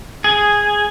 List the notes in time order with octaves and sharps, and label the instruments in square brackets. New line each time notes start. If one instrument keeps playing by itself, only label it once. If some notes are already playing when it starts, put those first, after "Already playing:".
[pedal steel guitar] G#4